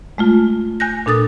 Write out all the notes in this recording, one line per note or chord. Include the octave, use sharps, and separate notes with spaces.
G#3 A3 F4
G#5 F#6 G6 A#6
A#2 D4 A4 D#6 A6